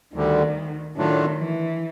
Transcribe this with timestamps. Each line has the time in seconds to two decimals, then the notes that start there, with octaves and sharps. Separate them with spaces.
0.14 D2 D3 D#3 G3
0.96 A2 D#3 F#3 A3 D4 F4
1.38 E3